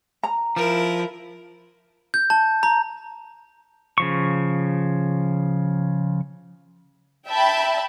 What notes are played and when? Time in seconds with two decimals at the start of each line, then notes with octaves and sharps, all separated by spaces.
0.23 A#5
0.56 F3 E4 A#4
2.14 G6
2.30 A5
2.63 A#5
3.98 C#3 F3 C#6
7.28 E5 G5 A5 B5